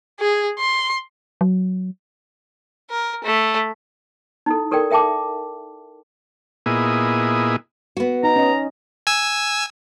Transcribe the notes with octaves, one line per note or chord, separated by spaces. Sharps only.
G#4
C6
F#3
A#4
A3
D#4 E4 A4
G4 A4 A#4 D5 G5
A#4 E5 G5 A5 D6
A#2 B3 E4 G#4 D#5
B3 F#4
D#4 A#5
C#4 D#5
G#5 E6